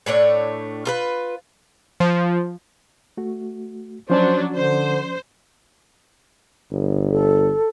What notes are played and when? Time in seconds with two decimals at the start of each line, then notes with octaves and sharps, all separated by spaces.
0.06 A2 A3 D4 C#5
0.85 F4 A#4 B4
2.00 F3
3.17 A3 F#4
4.10 F3 F#3 C#4 D4 C5 D5
4.55 D3 C5
6.72 G1
7.12 A4